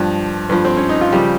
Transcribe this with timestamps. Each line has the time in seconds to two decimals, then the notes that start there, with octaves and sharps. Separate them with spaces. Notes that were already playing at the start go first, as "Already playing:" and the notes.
Already playing: G2 F3
0.49 G2 F3
0.65 C4
0.77 C#4
0.89 D#4
1.01 F4
1.13 C#3 F3 G3 G4